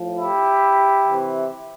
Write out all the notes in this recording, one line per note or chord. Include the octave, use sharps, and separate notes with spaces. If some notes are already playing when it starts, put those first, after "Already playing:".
Already playing: A2 F3
E4 G4
C3 E3